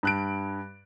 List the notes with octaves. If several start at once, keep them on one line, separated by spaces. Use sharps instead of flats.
G2 F#6 D7